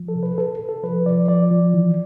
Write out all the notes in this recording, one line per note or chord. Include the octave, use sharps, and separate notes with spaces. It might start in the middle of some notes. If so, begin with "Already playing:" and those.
Already playing: F3
A4
C3
B4
C3 A4
C3
A4
F3 B4
F3 D5
F3 D5
F3
E3